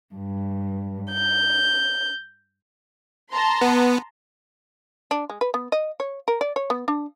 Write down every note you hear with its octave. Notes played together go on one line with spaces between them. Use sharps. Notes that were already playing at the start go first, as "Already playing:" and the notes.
G2
G6
A5 A#5 C6
B3
D4
G#3
B4
B3
D#5
C#5
A#4
D5
C#5
B3
D4